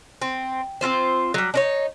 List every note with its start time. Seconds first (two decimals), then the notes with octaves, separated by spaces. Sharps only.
0.22 C4
0.81 C4 C#4 F4 C5
1.34 F#3 G3
1.54 D4 D#4 C#5